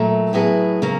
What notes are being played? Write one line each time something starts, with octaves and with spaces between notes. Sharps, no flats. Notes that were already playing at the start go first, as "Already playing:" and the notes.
Already playing: A#2 F#3 A3
A2 F#3 B3 E4 G#4
C#3 F#3 A#3